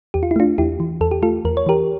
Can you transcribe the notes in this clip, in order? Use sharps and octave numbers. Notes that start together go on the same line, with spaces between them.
E2 G4
F4
E4
A3 D4 F4
E2 E4 G4
E3
E2 A4
G4
A3 F4 A4
E2 A#4
C#5
E3 G4 A#4